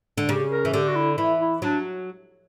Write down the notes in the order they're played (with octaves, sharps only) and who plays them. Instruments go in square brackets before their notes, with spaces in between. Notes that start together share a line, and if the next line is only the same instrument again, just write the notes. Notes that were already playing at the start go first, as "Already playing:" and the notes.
[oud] D3
[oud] C#3 [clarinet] G4
[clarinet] A#4
[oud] E3
[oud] D3 [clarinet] G4
[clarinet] F#4
E4
[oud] E3 [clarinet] E4
[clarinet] E4
[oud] F#3 [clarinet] D4